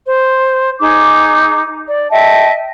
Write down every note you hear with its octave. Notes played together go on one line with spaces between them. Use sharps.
C5
D#4 G#4 D6
D5
D#5 E5 G5 A5